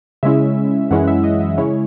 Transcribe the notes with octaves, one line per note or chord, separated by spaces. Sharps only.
C#3 G#3 C#4 E4 E5
F#2 E3 G#3 C#4 E4 F#5
E5
D#5
E5
C#3 G#3 C#4 E4 C#5